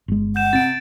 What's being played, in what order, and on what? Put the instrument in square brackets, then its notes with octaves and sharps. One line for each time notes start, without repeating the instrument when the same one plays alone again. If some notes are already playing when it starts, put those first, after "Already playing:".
[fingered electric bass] G1 G#3
[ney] F#5 [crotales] G6 E7
[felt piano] C3 [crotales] A6 D7